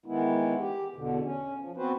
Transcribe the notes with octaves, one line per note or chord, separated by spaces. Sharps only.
D#3 E3 G#3 B3 E4
G4
E2 B2 D3
C#4
F3
B3 C4 F#4 B4 C5